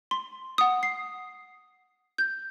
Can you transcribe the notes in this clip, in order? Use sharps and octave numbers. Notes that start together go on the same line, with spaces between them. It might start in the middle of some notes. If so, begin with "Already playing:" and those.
C6
F#5 D#6
C7
G6